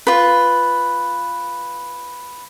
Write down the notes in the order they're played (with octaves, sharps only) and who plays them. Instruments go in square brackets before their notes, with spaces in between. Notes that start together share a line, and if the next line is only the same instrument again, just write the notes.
[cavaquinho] F4 B4